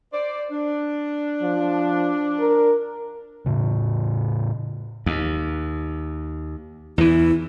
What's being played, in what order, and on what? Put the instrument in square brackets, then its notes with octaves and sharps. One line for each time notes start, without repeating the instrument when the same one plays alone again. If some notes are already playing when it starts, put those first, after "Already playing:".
[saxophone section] C5 D5
D4
[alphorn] F3
A#4
[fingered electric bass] A2 C#3
[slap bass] D#2
[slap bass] E2 E3 [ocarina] E4